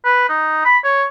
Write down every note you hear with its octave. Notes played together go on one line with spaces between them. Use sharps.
B4
D#4
B5
C#5